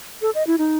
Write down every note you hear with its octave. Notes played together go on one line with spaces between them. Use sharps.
A4
D#5
E4
D#4